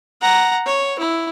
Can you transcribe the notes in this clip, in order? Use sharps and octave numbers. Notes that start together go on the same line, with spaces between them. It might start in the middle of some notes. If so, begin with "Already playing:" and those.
F#5 A#5
C#5
E4